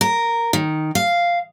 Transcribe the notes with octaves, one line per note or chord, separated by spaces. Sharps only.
A#4
D#3
F5